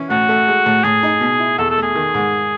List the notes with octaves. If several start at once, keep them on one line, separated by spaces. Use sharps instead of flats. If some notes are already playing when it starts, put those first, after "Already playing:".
Already playing: E3 C#4
A2 F#4
A3
G#3
A2
A2 G#4
D#4
B2
E4
E2 A4
A4
A3
G#4
D#3
G#2